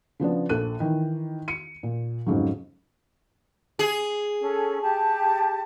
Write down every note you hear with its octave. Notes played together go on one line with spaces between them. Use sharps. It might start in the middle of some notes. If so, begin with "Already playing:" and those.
C#3 F3 B3 D4
A#1 A4 F#6 D#7
D#3 E3
C#7 D#7
A#2
F2 G#2 C#3 F#3
G#4
C#4 A4
G4 A5